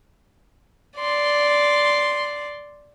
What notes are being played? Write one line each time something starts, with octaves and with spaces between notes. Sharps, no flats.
D5 C6